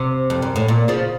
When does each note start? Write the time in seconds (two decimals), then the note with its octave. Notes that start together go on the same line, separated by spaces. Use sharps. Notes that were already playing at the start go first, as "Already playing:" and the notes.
Already playing: C3
0.30 F2
0.42 F#2
0.56 A2
0.68 A#2
0.88 C#3 F3